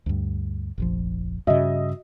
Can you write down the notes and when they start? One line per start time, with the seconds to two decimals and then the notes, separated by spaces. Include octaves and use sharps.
0.06 D2 G2
0.78 F1 A#1 F3
1.47 G2 C#3 F#4 D#5 E5